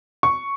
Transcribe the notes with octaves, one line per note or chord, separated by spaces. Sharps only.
C#6